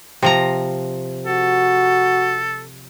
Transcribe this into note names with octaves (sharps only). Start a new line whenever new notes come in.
C3 F3 A#5
F#4 A4